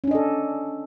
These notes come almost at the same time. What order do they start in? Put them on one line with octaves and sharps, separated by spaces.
C#4 D4 D#5 A4